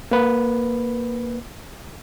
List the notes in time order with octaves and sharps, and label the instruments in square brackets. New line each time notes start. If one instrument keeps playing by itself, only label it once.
[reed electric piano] A#3 B4